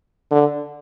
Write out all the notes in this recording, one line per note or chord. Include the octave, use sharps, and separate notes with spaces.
D3